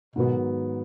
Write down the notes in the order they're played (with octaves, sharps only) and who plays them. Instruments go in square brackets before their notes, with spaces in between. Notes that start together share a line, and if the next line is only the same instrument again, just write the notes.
[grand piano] G#2 D#3 F#3 B3 [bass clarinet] B2